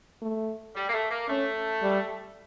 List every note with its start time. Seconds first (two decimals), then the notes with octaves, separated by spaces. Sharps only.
0.22 A3
0.76 G3
0.89 A#3
0.93 A3
1.11 A#3
1.29 A3 C#4
1.82 G3